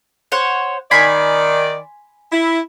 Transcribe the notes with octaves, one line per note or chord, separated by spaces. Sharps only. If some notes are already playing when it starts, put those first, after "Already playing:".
C5 C#5 F#5
D#3 D5 G#5 B5 C6
E4